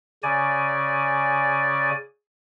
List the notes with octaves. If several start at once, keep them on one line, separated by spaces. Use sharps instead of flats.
C#3 D5 G#5